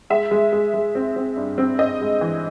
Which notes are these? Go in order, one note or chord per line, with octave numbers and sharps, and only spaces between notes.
G#3 E5
G#3
G#3
G#3
C4
C4
G2
C4
C4 D#5
G#3
E3